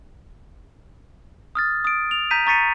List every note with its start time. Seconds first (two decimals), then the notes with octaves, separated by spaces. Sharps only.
1.55 D#6 F6 A6
1.85 D#6 D7
2.11 F7
2.31 A#5 G6 B6 D#7
2.47 A#5 C#6 A6 B6 C#7 D#7